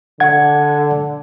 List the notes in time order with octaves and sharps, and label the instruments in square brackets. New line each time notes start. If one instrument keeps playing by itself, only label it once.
[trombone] D3 [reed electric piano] F#5 G#6